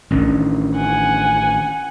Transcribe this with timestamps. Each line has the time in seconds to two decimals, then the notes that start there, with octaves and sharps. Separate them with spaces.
0.11 A1 D#3 C#4 D4 E4
0.77 F#5 G#5